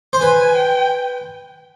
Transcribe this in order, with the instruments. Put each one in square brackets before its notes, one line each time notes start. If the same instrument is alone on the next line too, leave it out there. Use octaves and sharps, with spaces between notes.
[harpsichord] C5
[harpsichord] B4 [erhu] G#5
[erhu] G5